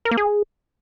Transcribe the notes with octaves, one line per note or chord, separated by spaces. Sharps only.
A#4
A#3
G#4